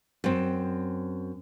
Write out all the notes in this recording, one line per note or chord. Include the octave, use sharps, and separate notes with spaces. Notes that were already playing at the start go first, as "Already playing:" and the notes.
F#2 C4